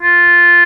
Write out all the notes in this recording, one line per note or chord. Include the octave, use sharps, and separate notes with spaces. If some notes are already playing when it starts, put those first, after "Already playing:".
F4